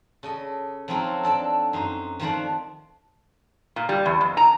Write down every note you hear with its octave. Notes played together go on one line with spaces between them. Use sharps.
C#3 A4 D#5
F3 F#3 C4 D#4 F4 A4
D4 A4 D5 A5
F#2 D#4 C5
D#3 F3 A3 C5 D5 F#5
A#2
G3
E2
F2
A#5